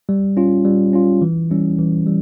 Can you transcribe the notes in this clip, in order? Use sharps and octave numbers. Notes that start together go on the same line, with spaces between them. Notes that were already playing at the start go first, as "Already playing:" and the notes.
G3
C#4 F4
G3
C#4 F4
E3
G3 C#4 E4
E3
G3